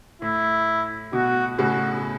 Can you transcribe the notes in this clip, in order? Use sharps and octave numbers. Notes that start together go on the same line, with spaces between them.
A2 E4
B2 F#4
A2 C#3 F#4